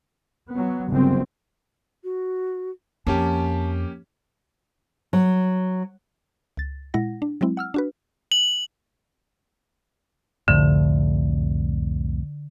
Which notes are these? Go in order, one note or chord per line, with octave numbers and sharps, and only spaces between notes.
F#3 B3
G1 F#2 C#3 C4
F#4
F2 A#3 C#4 G4 A5
F#3
C#2 A6
A#2 G#3 E4 F#5 A#6
D4
F#3 G#3 C4 E4
F#5 E6 F6
D4 F#4 B4
F#7
C2 F2 A2 D3